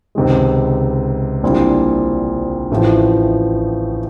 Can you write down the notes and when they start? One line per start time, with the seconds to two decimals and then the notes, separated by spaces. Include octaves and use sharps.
0.15 C#2 C3 D#3 G#3
1.43 A#1 A#2 G3 C4 E4
2.71 A1 A2 F3